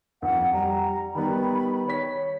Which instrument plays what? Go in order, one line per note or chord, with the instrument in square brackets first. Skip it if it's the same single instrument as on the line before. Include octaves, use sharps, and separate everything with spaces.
[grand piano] F2 [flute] F#5
[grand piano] G3 [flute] A#5
[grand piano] D#3 G3 B3 [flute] B5
[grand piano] C#5 B6